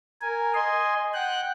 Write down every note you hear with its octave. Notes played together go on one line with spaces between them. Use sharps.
A#4 G#5
D#5 G#5 C6
F#5 G5 F#6